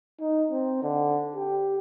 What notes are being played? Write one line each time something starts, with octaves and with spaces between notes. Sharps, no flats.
D#4
C4
D3
G4